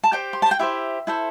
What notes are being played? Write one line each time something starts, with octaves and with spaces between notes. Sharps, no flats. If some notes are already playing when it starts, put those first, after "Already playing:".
A5
G4 C5 G5
C6
A5
G5
E4 G4 C5 E5
E4 A4 C5